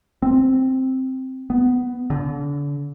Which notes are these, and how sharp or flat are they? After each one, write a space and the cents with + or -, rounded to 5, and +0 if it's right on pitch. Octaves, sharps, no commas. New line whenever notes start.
C4 +0
B3 +10
D3 -35